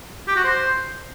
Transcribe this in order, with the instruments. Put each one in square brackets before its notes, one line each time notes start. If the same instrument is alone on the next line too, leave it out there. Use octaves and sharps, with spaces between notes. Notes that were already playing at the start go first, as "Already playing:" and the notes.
[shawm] G4
F#4
C5